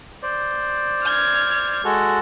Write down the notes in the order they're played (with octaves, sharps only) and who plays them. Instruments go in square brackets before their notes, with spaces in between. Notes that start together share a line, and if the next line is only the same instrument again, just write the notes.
[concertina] C5 D5
[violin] F6 G#6
[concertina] G#3 F#4 A4